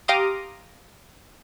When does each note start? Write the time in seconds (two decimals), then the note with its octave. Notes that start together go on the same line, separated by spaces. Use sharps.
0.08 G4 F5 A#5 C6 D6 D#6